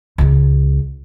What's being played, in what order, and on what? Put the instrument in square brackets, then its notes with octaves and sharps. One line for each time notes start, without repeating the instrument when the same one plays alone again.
[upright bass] C#2 G#3